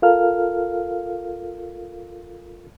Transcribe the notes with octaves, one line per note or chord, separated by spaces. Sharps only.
F4 A4 A#4 F5 F6